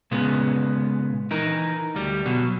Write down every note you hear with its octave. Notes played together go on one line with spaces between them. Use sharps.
A#2 C#3 G#3 B3
E3 D#4 A#4
D2 G3
B2 F#3